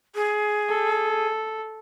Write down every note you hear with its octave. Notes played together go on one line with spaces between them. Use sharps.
G#4
A4